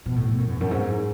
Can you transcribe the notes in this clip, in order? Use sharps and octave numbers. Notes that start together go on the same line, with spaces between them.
B2
A2
G#2
F#2
E2
F#2
G#2